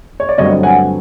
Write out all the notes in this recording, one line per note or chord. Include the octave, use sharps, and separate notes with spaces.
C#5
D5
G2 D3 F#3 A3 C4 C#5 D#5
F#5 G#5